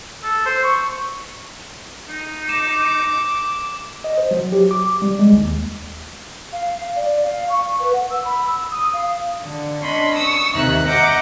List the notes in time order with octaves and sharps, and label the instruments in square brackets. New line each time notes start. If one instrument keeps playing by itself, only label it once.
[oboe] A4
C5
C#6
[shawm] D#4
[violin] D6 [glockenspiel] E7
[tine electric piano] D#5
C5
F#3
G4
D6
G3
G#3
D#2
[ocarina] F5
F5
D5
F5
C#6
B4
F#5
E6
B5
E6
D#6
F5
[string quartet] D3
C#4 D4 D#5 B5 C6
C#6 D#6 E6
D#2 C3 D#4 E5 F#6
D#5 E5 F#5 A#5 D6 G6